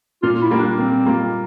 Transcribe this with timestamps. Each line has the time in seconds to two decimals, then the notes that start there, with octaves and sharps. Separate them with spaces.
0.23 A#2 F4
0.42 E4
0.51 G3 A#3 F4
0.59 D4
0.78 A#2 C4
1.06 G3 A#3 F4